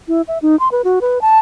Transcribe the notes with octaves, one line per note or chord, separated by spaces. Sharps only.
E4
E5
D#4
C6
B4
F#4
B4
A5